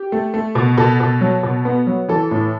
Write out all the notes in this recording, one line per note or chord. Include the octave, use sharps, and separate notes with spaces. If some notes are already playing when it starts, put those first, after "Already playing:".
Already playing: G4
A3
A3
B2
B2 A4
B2
F#3
B2
B3
F#3
E3 A4
A2